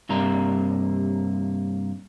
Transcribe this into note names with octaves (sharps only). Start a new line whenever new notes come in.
G2 C3 A#3 A#5